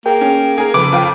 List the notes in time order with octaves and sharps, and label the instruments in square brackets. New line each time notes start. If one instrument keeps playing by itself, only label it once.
[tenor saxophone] A#3 [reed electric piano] G#4 A#4 G5
[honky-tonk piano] C#4
G#4 A#4
[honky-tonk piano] F2 [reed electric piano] C#3 [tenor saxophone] B4 [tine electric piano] D6
[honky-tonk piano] F2 F5 G5 [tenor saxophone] F3